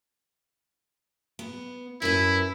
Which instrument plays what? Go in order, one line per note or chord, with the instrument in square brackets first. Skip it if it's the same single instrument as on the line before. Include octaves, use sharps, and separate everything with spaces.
[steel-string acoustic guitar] B3
[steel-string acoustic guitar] F#2 B4 [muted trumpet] E4